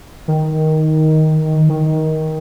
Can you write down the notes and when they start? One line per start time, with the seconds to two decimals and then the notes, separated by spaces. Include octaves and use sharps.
0.28 D#3
1.69 D#3